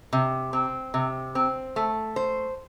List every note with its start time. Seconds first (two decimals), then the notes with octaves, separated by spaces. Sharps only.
0.13 C3
0.53 C4
0.94 C3
1.35 C4
1.76 A3
2.16 C5